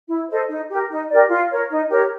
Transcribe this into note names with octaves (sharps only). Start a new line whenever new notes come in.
E4
A4 C5 D#5
D#4
G4 A#4
D#4
G4 A#4 D5
F4
A#4 C#5
D#4
G4 A#4 C#5